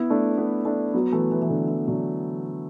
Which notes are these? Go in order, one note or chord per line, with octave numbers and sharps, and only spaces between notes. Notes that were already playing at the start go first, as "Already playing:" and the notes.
Already playing: B3 E4
A3 D4
B3 E4
A3 D4
F#3 B3
E3 A3
E3
E3
D3
E3
D3 F#3